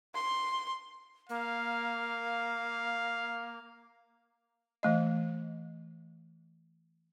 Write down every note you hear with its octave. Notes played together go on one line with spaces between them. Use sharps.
C6
A#3 F5
E3 A3 D#5